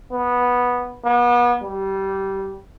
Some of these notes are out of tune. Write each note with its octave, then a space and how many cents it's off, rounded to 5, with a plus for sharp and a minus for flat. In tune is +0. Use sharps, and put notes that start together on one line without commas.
B3 -10
B3 -35
G3 -20